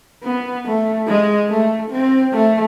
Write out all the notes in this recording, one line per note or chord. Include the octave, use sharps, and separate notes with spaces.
B3
A3
G#3
A3
C4
A3